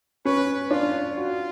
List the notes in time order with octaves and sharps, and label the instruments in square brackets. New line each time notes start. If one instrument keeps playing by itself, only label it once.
[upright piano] C#4 [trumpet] B4
[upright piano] D4 [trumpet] F4
[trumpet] F4 [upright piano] F#4